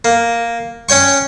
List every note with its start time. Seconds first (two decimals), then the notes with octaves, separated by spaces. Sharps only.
0.05 A#3
0.89 C#4 C#5 G5 C#6